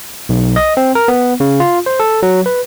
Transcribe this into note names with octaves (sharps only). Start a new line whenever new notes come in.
B1
D#5
C4
A#4
B3
C#3
F4
C5
A4
F#3
B4